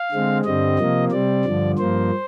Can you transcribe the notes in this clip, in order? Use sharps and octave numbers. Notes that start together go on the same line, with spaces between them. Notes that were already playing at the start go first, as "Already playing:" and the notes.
Already playing: F5
D3 G#3 C4
G2 D3 G3 C4 D#5
C3 F3 A#3
C3 G3 C4 D5
G2 D3 F3
G2 F3 A#3 C5